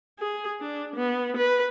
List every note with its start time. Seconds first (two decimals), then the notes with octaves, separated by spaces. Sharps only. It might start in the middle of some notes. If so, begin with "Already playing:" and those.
0.19 G#4
0.61 D4
0.96 B3
1.37 B4